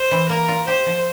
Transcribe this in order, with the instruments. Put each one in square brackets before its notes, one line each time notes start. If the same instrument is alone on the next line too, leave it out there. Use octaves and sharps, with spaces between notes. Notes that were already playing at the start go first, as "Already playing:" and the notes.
Already playing: [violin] C5
[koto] E3
[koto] A#3 [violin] A#4
[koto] F4
[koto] G4 [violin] C5
[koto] F3